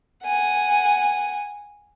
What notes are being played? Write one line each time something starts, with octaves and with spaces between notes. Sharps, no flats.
F#5 G#5